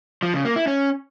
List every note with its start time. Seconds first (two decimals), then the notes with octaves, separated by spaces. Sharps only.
0.23 F3
0.34 C#3
0.45 A#3
0.56 E4
0.67 C#4